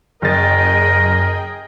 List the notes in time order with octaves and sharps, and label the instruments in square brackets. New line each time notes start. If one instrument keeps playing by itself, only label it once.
[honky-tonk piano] F#1 A6 [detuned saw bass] F#2 [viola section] G#4 D#5 G5 [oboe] A#4